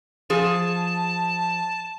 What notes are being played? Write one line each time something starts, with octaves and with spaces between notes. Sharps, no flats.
F3 G#4 A5